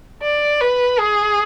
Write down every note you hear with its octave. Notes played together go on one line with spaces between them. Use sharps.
D5
B4
G#4